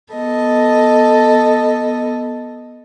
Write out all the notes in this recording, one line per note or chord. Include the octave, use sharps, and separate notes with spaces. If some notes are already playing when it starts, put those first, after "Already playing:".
B3 A4 D#5